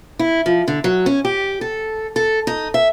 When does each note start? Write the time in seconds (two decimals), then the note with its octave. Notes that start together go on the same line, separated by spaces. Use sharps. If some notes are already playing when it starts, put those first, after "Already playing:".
0.19 E4
0.46 F3
0.68 D3
0.84 F#3
1.06 C#4
1.25 G4
1.61 A4
2.16 A4
2.47 D#4
2.74 E5